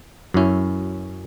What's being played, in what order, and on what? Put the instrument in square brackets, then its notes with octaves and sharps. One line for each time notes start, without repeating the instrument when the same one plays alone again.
[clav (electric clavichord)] F#2 C#4 [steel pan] F#3 E4